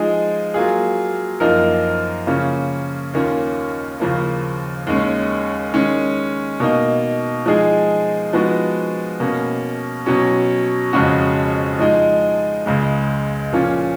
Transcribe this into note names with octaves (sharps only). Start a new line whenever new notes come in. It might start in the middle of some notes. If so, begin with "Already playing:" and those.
Already playing: F3 G#3 D#4 G#4
F#3 A#3 F4 G#4
F#2 F3 A#3 D#4 A#4
C#3 F3 A#3 C#4
D#2 D#3 A#3 C#4 F4
D#2 C#3 F3 A#3
D#2 D#3 G#3 C#4
D#3 G#3 C#4
B2 A#3 D#4
F3 G#3 D#4 G#4
F3 G#3 B3 D#4 F#4
B2 A#3 C#4
B2 F#3 C#4
F2 C#3 G#3 C#4 F#4
F3 G#3 D#4
C#2 C#3 G#3
A#2 F3 A#3 C#4 F4